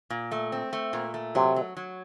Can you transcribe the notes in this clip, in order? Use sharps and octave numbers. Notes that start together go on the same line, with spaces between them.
A#2
A3
C4
A3
A#2
A3
C3 F#3
F#3
F#3